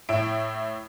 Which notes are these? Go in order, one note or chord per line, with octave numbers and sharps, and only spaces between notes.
A2 E4 E5 D7